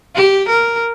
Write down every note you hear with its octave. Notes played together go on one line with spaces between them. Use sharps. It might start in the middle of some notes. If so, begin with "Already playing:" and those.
G4
A#4